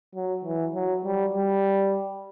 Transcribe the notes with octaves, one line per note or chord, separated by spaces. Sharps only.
F#3
E3
F#3
G3
G3